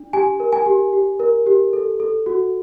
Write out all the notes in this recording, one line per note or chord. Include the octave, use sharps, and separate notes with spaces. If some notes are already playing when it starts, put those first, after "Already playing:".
Already playing: D4
G4 G#5
A#4
G#5
G4
G4
A#4
G4
A4
A4
F#4